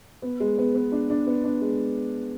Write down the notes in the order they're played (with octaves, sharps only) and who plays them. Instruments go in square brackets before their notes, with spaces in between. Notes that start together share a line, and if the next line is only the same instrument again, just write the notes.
[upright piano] B3
G#3
B3
B3
D4
D4
B3
D4
G#3